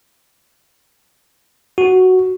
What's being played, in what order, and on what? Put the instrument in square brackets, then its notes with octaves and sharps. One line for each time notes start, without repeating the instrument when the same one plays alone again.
[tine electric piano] F#4